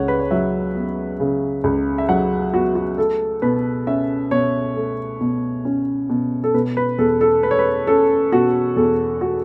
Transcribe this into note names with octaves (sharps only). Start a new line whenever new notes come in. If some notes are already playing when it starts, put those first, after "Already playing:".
Already playing: C#2 C#3 C#5 F#5
B4
C#5
F#3 E5
B3
C#3
C#2
E5
F#3 F#5
B3 F#4
F#4
A3 A4
B2 B4
C#4 E5
B2 C#5
A3
B2
C#4
B2
A4
B2 B4
B4
E2 A4
A4
A3 B4
C#5
B4
C#4 A4
B2 F#4
E2 A4
A3 F#4